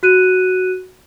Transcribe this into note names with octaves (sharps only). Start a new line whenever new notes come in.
F#4 F#6 D#7